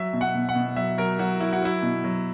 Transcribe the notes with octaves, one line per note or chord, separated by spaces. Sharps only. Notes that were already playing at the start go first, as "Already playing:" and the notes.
Already playing: F#3 E5
B2
F#5
B2
F#5
B2
F#3 E5
F#3 A#4
F#3 F#4
F#3 E4
F#4
F#3 E4
B2
F#3